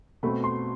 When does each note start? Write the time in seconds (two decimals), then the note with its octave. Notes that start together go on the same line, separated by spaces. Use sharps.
0.23 B2 A3 C4 B5
0.44 C6